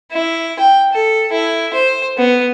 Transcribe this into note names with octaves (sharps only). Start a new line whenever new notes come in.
E4
G5
A4
E4
C5
B3